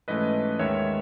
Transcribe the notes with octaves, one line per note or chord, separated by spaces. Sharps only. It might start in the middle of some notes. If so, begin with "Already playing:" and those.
G#2 E3 A3 C#4 B4 D#5
D#2 D#3 G#3 B3 C#5 E5